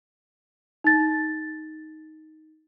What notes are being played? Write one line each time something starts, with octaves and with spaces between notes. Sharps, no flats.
D#4 A6